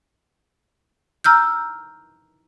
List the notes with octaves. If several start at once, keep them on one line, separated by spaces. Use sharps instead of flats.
A#5 E6 F6 G6